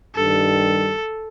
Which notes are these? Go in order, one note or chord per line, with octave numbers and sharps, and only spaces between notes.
G2 D#3 G3 A4